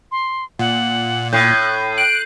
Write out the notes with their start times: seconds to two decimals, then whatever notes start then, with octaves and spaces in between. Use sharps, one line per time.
0.12 C6
0.59 A#2 F#5
1.33 A2 F#6 G6 C7 D#7
1.98 F#6 D7